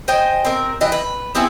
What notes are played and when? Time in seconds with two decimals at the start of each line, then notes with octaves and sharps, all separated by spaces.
0.08 C5 D#5 G5 G#5
0.45 C4 A#4
0.81 E3 D#5 G5
0.92 B4
1.35 B3 C4 E4 G#4